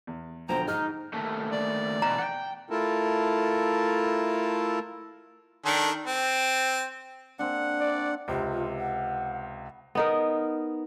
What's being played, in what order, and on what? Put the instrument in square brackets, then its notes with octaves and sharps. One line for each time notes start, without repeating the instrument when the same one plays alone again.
[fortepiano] E2
[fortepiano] B1 D3 F3 [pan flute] C5 [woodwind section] G5 A#5
[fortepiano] G#2 [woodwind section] D#4 [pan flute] F6
[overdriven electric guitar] D#2 A3
[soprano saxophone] D5
[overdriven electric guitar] B2 E3 [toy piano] A#5
[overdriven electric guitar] F#5 G5
[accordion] A3 E4 F4 A4 A#4 A5
[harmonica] D#3 D4 A4
C4
[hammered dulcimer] A#3 C4 D4 [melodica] F#5
[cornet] D5
[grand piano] C#2 C3 [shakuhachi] F4
[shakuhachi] F#5
[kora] B3 D#4 A#4